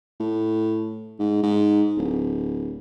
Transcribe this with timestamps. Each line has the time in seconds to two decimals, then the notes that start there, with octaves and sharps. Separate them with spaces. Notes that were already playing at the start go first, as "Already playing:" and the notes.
0.20 A2
1.20 G#2
1.43 G#2
1.97 D1